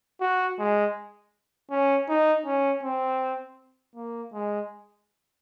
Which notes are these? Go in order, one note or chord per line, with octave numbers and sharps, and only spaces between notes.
F#4
G#3
C#4
D#4
C#4
C4
A#3
G#3